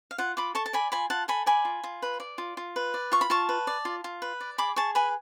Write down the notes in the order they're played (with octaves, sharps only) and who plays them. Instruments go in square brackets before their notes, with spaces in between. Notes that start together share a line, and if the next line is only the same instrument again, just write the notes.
[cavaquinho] F5
F4 F#5
F4 B5 D6
A4 A5 C#6
A5
D5 G#5 B5
F4 G#5 B5
F4 F#5 A5
A4 G#5 B5
D5 G#5 B5
F4
F4
B4
D5
F4
F4
B4
D5
F4 C#6
B5
F4 A5 C#6
B4
D5
F4
F4
B4
D5
G#4 B5 D6
G#4 A5 C#6
B4 G#5 B5